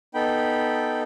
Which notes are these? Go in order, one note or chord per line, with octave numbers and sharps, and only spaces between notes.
B3 D#4 A4 G5 B5